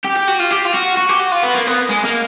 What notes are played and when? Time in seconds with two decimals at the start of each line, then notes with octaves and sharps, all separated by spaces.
0.04 G4
0.16 G4
0.28 F#4
0.40 F4
0.51 G4
0.65 F4
0.74 F#4
0.97 F#4
1.09 G4
1.20 F#4
1.32 F4
1.43 B3
1.55 A#3
1.67 B3
1.89 G#3
2.05 A#3